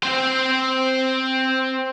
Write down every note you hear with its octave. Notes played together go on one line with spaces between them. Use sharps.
C4 C5